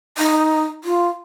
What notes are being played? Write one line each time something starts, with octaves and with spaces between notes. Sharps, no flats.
D#4
F4